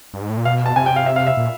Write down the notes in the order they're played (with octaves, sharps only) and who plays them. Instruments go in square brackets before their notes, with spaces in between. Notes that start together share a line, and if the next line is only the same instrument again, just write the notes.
[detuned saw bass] G2
G#2
A2
A#2
[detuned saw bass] B2 [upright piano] F5
[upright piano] A5
[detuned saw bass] C3 [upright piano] G#5
[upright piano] G5
F5
E5
F5
E5
[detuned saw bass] A#2